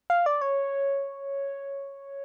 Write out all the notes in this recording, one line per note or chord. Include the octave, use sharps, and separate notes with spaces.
F5
D5
C#5